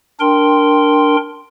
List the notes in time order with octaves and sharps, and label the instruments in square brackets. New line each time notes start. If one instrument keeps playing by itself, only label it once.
[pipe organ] D4 A#4 G5 C6